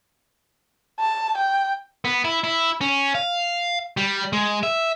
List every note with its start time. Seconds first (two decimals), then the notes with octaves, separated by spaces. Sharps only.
1.00 A5
1.37 G5
2.05 B3
2.25 E4
2.44 E4
2.81 C#4
3.15 F5
3.97 G3
4.33 G#3
4.63 E5